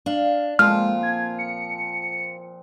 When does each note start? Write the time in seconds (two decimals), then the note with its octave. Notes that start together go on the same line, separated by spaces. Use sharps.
0.06 D4 F5
0.59 A#2 F3 G#3 C4 F4 F6
1.03 G#6
1.39 C#7